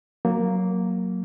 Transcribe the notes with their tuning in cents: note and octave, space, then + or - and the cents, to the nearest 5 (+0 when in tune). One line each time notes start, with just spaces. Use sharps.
F#3 +0 A#3 +0